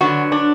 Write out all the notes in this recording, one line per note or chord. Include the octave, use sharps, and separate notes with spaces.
D3 F#3 B3 D4 F#4
D4